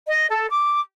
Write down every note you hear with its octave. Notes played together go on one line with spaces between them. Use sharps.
D#5
A4
D6